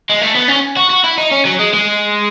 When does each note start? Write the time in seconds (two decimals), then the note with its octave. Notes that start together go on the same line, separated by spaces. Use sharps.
0.10 G#3
0.22 A3
0.35 B3
0.48 C#4
0.77 F#4
0.90 F#4
1.04 E4
1.18 D#4
1.31 C#4
1.45 F#3
1.60 G#3
1.74 G#3